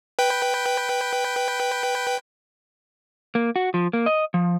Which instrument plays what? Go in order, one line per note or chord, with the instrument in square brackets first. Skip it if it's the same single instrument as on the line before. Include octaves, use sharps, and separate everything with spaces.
[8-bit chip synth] B4 G5
[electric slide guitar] A#3
F#4
F3
A#3
D#5
F3